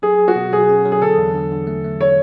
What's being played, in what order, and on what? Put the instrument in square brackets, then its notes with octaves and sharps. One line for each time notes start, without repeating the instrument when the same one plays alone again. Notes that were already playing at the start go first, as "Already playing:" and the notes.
[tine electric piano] F#3 [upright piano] G#4
[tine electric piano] F#3
[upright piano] F#4
[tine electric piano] B2
[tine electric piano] F#3 [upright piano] G#4
[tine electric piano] C#4
F#3
[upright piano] G#4
[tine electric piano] D3 [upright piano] A4
[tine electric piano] E2
D3
D3
A3
A3
[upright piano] C#5